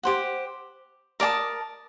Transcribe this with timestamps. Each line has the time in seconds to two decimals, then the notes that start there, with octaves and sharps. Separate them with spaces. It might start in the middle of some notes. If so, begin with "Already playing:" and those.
0.03 G4 C5 F#5
1.20 A#4 D5 A5 D#6